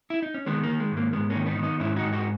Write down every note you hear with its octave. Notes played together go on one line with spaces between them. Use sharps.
E4
D#4
C#4
D#3 G#3 B3
A#3
D#3
G#3
G#2
A#3
G#2 G#3 B3
A#3 C#4
D#3
B3 D#4
D#3
B3 D#4
G#2 C#4 E4
D#4 F#4
G#2
D#4 F#4